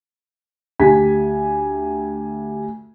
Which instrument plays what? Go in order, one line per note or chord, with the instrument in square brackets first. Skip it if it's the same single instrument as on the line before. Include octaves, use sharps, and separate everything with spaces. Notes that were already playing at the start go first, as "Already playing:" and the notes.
[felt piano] D2 G4 G#5 B6